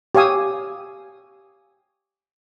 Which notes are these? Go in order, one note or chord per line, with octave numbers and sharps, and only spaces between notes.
G4 C#5 F5 G#5 D#6 E6